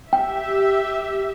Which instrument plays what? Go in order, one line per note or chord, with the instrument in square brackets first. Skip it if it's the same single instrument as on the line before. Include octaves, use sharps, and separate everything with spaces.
[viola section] G4 E5 [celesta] G5